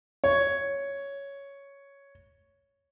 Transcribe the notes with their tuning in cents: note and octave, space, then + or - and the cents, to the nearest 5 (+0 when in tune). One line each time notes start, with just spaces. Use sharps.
C#5 +5